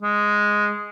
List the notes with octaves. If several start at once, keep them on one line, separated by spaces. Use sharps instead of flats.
G#3